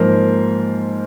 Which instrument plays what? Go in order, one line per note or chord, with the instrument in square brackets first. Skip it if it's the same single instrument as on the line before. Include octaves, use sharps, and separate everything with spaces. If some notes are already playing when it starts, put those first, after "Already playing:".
Already playing: [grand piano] G#2 F3 A#3 A#4 C5